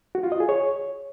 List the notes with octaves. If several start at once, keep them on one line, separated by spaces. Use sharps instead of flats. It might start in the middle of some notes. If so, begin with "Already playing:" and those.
F#4
F4
D#5
G#4
C#5